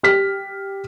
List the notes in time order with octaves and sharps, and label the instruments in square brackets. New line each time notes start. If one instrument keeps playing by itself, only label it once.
[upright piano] G4 F6 B6